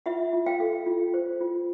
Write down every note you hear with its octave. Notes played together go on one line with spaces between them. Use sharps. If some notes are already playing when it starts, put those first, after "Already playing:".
F4 E5 F#5
F4
F5 G5
A4
F4
C5
F4